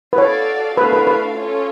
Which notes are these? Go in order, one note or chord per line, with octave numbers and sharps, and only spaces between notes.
B4
F#4 A4 C#5 D5 F5
A3 D4 F#4 A4 B4 F5
B4
B4
C#4 F4 A4 C#5